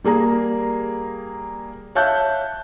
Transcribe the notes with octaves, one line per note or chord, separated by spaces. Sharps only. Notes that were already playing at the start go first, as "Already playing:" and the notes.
G3 A#3 G#4 A#5
C#5 E5 F5 A5 F#6 G6